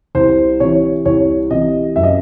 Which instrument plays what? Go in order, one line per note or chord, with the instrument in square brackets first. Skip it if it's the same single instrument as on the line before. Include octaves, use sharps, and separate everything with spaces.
[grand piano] C2 C5
C3 E3 C#5
C2 C#5
C3 E3 D#5
F#2 E5
D#5